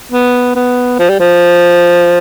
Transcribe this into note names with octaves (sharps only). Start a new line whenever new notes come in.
B3
B3
F3
G3
F3